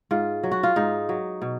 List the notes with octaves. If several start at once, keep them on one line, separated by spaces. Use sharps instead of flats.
G#2 F4
F#3
F#4
F4
G#2 D#4
F#3
B2